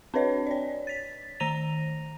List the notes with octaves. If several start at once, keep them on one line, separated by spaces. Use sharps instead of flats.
C4 D4 B4 C#5 D#5
C#5 D5
A6 B6
D#3 A#5 A#6 D#7 F7